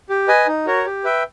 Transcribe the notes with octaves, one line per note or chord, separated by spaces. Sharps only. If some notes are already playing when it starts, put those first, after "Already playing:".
G4
B4 D#5 G#5
D#4
F#4 A#4 C#5
G4
B4 E5 G5